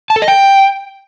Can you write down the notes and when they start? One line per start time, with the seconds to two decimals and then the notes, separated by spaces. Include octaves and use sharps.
0.10 A5
0.16 A4
0.22 D#5
0.28 G5